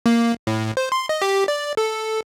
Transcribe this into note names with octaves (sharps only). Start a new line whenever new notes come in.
A#3
A2
C5
C6
D#5
G4
D5
A4